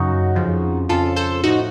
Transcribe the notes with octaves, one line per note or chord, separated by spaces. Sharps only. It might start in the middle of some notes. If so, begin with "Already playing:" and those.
Already playing: F#2 C#3 F#3 D#4 F#4
F2 C#3 F3
F2 C#3 F3 F4 A4
A4 C5
A2 F3 D#4 F#4